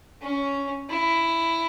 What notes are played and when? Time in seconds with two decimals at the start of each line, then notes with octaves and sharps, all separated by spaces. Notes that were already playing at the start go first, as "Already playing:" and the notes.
0.22 C#4
0.90 E4